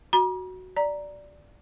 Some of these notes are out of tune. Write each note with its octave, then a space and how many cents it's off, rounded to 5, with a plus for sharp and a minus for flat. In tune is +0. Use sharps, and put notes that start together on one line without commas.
F#4 +0 A#5 +45
D5 +0 A#5 +0